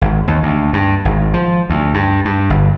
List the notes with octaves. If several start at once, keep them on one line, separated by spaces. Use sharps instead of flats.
G#1
D#2
D2
G2
G#1
F3
D2
G2
G2
G1